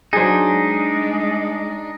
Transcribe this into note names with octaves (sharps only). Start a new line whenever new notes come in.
F#3 D4 D#4 G#4 C5
G#3